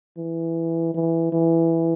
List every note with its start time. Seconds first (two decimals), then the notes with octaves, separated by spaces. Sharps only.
0.17 E3
0.94 E3
1.32 E3